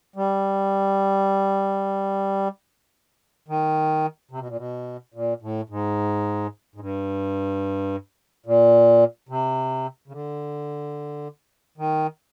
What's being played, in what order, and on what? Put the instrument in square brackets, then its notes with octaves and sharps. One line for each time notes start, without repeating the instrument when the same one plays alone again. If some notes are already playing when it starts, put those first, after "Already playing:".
[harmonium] G3
D#3
C3
B2
A#2
B2
A#2
A2
G#2
G#2
G2
A#2
C3
C#3
D3
D#3